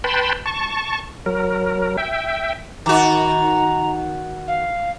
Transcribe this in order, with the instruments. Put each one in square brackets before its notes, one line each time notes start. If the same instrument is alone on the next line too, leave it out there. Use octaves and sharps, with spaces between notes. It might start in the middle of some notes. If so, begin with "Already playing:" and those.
[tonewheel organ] B4 G5 A5 B5 C6
A5 C#6
F#3 A#4
E5 G5
[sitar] D#3 F#4 [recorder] A#5
[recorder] F5